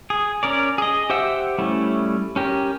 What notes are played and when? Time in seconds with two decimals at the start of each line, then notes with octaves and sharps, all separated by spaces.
0.10 G#4
0.43 C#4 A#4 D5
0.78 G#4 D#5
1.10 G4 C5 E5 F#5 E6
1.59 G3 A3 C#4 E4
2.36 C#4 G4 A#4